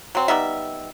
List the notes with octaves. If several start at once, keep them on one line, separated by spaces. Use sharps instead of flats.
F#3 C4
G3 B3 D#4 E5